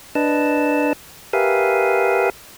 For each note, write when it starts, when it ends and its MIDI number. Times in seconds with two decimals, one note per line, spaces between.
0.15 0.93 62
0.15 0.93 71
0.15 0.93 75
0.15 0.93 81
1.33 2.30 67
1.33 2.30 70
1.33 2.30 71
1.33 2.30 76
1.33 2.30 77
1.33 2.30 80